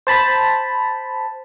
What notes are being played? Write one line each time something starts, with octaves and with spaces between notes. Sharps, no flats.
C5 A5 B5